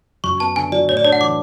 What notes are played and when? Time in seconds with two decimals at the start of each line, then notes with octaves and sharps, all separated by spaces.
0.24 F#2 C#6
0.40 B3 A5
0.56 D3 G#5
0.72 F#3 D5
0.89 A2 C#5
0.97 D5
1.04 D4 C#5
1.12 F#5
1.21 E3 D6